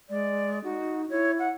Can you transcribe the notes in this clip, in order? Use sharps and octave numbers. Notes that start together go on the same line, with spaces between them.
G#3 D5
D#4 F#4
E4 C#5
F#5